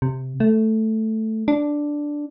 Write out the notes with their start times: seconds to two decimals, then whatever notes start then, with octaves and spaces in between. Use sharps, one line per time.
0.02 C3
0.40 A3
1.48 D4